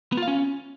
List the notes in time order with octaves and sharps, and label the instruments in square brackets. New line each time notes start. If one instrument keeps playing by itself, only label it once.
[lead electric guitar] B3
F4
F5
C#4